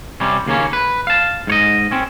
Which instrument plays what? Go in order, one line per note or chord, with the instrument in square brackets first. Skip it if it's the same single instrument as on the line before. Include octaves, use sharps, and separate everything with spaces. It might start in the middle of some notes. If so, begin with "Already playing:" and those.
[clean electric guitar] C3 G3 C#4
D#2 C#3 A#3 C#4
B4
F5 A5
G#2 C#5 D#5
C4 C#4